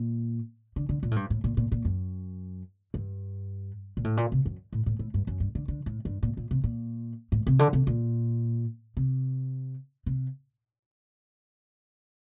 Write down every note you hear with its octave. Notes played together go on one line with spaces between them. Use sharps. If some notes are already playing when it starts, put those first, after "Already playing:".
Already playing: A#2
D3
D3
A#2
A2
G2
A2
A#2
A#2
A#2
F#2
G2
A#2
A2
A#2
C3
F#2
A2
A2
A2
G2
F#2
G2
D3
D3
A2
G2
A#2
A#2
C3
A#2
A2
C3
D3
C3
A#2
C3
C3